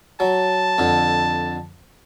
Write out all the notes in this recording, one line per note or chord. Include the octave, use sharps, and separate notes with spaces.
F#3 A5
F2 D3